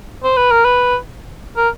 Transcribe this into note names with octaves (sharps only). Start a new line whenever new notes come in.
C5
B4
A#4
B4
A#4